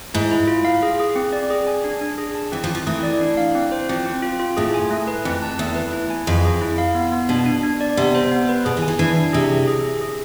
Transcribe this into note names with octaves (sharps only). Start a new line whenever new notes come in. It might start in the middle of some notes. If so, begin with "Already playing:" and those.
G#2 E4
E4
F4
F5
G#4
G#4
C4
D5
G#4
G#5
D4
D4
G#4
A5
E3 C4
F3
C4
F3
E3 A3
D5
D4
F5
C4
C5
F3 C4
C4
F4
F4
A2 G#4
G#5
A3
B4
F2 C4
A5
E2 A3
B4
E4
G#5
F2 G#4
G#4
E4
F5
B3
B3
B2 D4
D4
D4
D5
C3 B3
C5
B3
B4
B2 G#4
E3
G#5
E3
E3 D4
D4
C3 G#4
G#4
G#4
G#4
G#4